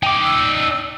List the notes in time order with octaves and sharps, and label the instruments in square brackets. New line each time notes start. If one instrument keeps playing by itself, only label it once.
[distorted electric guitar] D#4 D5 [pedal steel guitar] G5 D6
[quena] E6